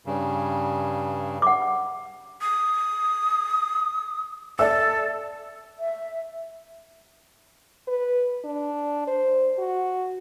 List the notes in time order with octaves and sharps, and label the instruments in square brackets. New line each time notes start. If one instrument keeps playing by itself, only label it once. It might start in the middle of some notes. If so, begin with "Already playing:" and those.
[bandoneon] G2 C#3
[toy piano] F#5 D6
[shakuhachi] D#6
[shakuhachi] A4 [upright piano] D5 E5 E6
[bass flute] E5
[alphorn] B4
D4
C5
F#4